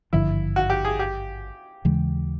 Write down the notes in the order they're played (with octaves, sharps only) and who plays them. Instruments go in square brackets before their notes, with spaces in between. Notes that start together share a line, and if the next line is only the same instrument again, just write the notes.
[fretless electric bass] G#1 G2 D3 F3 [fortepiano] E4
[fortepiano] F#4
G4
G#4
G4
[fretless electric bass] D#2 C#3 E3 G#3